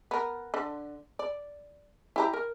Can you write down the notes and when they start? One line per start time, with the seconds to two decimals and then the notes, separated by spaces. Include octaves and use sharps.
0.11 B3 A#4
0.54 D3
1.19 D5
2.16 E4 G4 A#5
2.33 A#4